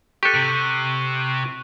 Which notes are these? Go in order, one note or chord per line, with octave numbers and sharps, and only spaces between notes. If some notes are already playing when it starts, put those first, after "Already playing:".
G4 A4 C#6 F#6
C3